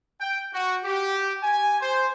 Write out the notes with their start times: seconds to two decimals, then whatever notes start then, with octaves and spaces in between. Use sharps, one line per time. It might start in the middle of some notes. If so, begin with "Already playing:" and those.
0.20 G5
0.53 F#4
0.84 G4
1.43 G#5
1.81 C5